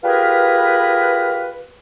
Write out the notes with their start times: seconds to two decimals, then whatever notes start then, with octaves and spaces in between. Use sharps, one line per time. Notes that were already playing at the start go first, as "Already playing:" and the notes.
0.03 F4 G4 G#4 A#4 B4